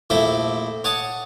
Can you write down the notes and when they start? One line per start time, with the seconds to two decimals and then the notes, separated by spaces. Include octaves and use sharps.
0.10 A#1 A3 C4 E4 E5
0.84 C#5 F#5 A5 D#6